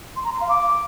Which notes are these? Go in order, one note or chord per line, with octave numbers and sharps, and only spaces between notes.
C6
A#5
C6
F5
D6